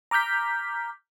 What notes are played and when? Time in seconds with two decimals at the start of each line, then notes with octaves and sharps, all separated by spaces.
0.11 A#5 D6 F6 G6 B6